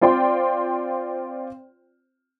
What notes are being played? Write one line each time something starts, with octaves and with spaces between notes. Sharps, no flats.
C4 F4 C5 D5 G5 C6